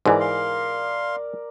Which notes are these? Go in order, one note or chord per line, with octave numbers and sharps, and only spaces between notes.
G#2 E3 A#4 D5
F5 C6